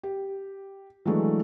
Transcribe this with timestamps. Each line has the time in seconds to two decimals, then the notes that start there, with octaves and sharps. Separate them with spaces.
0.03 G4
1.05 E3 F#3 G#3 A3 D4